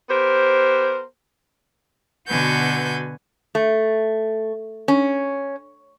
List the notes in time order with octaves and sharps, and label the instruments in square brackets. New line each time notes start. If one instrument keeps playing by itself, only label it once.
[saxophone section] B3 G4 A#4 C5
[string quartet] B2 D3 F#4 B4 G#5 G6
[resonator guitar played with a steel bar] A3
C#4